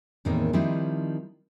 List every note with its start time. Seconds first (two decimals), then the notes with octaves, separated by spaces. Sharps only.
0.25 E2 A2 D#3 A#3 C4 D#4
0.53 D#3 F3 G3 C4 D#4 E4